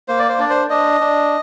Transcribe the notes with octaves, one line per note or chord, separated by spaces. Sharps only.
A#3 C5
D5
C5
D4 D5
C5
D4 D#5
D4